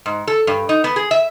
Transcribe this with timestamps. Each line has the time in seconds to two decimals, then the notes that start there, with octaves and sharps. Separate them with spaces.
0.06 G#2
0.27 A4
0.47 G2
0.69 D#4
0.84 B3
0.96 G#4
1.11 E5